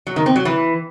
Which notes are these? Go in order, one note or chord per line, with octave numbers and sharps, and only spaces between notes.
F#3
D#3
C4
F#3
E3